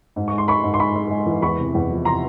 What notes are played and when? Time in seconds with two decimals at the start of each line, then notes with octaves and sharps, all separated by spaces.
0.16 G#2
0.28 G#3 C#6
0.38 C6
0.48 G#3 B5 C#6
0.63 G#2
0.74 C6
0.79 G#3 B5 C#6
0.96 G#3
1.11 G#3
1.26 E3
1.42 E2 B5 C#6
1.58 C3
1.74 E2
1.90 F3
2.05 C3 A#5 C6